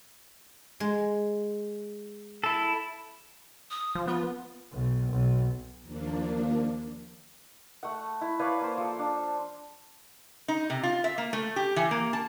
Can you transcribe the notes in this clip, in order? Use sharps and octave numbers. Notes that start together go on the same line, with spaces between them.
G#3
E4 A4
D#6
F3
B3 F4
B1
B1
D#2 F3 A#3 D4
A3 F#5
E4
B4 C#5 D5 F5
A#3 C5
F3 A4
D4
D#4
C3
F4
E5
A#3
A3
G4
E3
A#3
A5